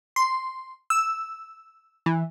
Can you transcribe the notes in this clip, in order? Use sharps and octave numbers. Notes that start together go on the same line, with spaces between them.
C6
E6
E3